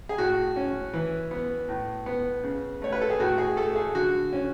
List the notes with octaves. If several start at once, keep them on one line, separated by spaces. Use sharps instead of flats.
G#4
A2 F#4
C#4
E3
B3
A2
B3
C#3
A3 C#5
B4
A4
G#4
A2 F#4
G#4
A3 A4
G#4
D3 F#4
C#4